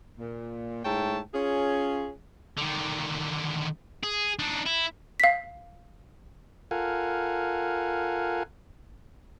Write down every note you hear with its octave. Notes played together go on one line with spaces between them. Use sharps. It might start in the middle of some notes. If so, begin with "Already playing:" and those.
A#2
G#2 A3 E4 C#5 G5 A5
C#4 F4 G#4
D3 D#3
G#4
D4 D#4
E4
F5 B6
F4 A4 A#4 F5 F#5 G#5